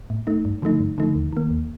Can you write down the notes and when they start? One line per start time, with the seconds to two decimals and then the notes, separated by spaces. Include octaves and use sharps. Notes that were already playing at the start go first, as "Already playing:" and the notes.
0.10 A2
0.27 A3 D#4
0.45 G2
0.62 D3 F3 A3 D#4
0.80 G2
0.98 D3 F3 A3 D#4
1.15 D#2
1.33 D#3 A#3
1.50 D#2